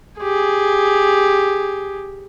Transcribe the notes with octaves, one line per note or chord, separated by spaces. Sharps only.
G4 G#4